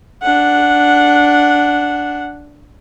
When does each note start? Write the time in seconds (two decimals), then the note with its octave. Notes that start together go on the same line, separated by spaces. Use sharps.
0.23 D4 F#5